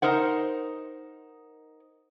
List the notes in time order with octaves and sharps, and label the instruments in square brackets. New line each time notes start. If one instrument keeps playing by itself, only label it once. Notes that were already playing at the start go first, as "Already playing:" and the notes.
[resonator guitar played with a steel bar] D#4 A#4 C5 F#5